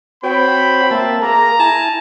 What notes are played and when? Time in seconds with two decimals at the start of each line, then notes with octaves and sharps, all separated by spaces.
0.23 C4 F#4 C#5 G5 B5
0.91 A#3 E5 A5
1.22 A#3 G#4 A#4 A#5
1.59 E4 G#5 A5